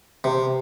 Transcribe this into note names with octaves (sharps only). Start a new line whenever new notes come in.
C3